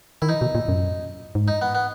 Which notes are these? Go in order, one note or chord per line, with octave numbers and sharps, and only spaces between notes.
D#3 E4
E3 D#4
B2
A#2
F#2
G#2
D#4
B3
B3